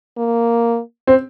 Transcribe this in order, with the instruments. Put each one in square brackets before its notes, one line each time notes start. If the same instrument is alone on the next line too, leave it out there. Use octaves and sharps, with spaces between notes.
[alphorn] A#3
[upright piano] C4